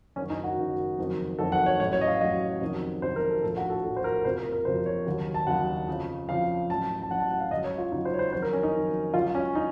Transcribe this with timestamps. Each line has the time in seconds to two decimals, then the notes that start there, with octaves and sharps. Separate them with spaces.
0.16 F#1 F#2 D#3 F#3 C#4
0.30 D#4
0.44 F#4
0.58 F#1 F#2 D#3 F#3
0.99 F#1 F2 D#3 F#3
1.38 F#1 F2 D#3 F#3 A4
1.52 F#5
1.66 C#5
1.80 A1 A2 F#3 C#5
1.93 C#5
2.01 D#5
2.07 F5
2.21 A1 A2 F#3 D#5
2.61 F2 C3 D#3 F#3
3.02 F2 C3 D#3 F#3 C5
3.16 A#4
3.29 A4
3.43 A#1 A2 F3 A4
3.57 F#4
3.70 A4
3.84 A#1 A2 F3 A4
3.97 C5
4.04 A#4
4.25 F#1 F2 C3 F3 C5
4.38 A#4
4.52 A#4
4.65 F#1 F2 C3 F3 C5
4.86 C#5
5.07 D#2 C#3 F#3
5.34 A5
5.47 D#2 C#3 F#3 F#5
5.88 F2 C#3 F3
6.28 F2 C#3 F3 F5
6.69 A1 A2 F#3 A5
7.02 A5
7.10 A1 A2 F#3 F#5
7.20 A5
7.31 F#5
7.40 F5
7.51 C#2 C#3 F#3 D#5
7.64 C#5
7.78 F4
7.92 C#2 C#3 F#3 D#4
8.05 C5
8.14 C#5
8.19 C5
8.33 F2 D#3 F#3 C5
8.42 A#4
8.53 C#4
8.63 D#4
8.74 F2 D#3 F#3
9.14 C#2 C#3 F#3 F4
9.35 C#4
9.55 D#4